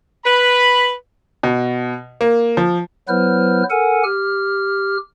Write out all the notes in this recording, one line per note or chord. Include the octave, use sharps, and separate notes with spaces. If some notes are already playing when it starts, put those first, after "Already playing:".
B4 B5
B2
A#3
F3
F#3 B3 E4 B4 C5 F6
A4 A#4 F#5 G#5
G4 F6